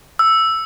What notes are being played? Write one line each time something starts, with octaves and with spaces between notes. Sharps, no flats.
E6